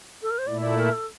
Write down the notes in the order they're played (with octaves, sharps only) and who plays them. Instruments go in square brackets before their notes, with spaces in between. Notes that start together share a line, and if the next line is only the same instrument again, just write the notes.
[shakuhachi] A4
A#4
C5
[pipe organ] A#2 A3 E4 [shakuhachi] D5
[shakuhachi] D5
A#4
A4